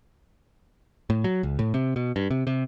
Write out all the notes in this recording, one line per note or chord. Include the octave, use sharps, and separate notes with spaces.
A2
F#3
C#2
A2
C3
B2
G2
C3
C3